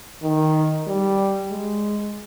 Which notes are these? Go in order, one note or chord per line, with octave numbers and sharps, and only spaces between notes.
D#3
G3
G#3